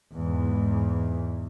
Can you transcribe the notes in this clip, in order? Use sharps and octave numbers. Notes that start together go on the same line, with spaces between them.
E2 G#2